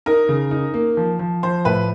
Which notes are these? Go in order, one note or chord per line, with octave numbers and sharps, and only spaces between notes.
D#4 A#4
C#3
D#4
A#3
F3
F3
F3 C5
A2 B4